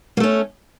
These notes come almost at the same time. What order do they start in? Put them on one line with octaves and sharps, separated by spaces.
A#3 A3 C#4